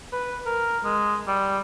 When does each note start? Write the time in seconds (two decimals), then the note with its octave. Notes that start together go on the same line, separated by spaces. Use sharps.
0.13 B4
0.46 A#4
0.84 G#3
1.27 G3